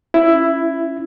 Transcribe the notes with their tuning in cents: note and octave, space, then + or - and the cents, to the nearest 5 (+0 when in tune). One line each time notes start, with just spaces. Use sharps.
C#4 +0 E4 +10